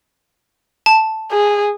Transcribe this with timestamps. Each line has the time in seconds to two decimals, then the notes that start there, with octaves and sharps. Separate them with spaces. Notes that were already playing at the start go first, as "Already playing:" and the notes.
0.86 A5
1.31 G#4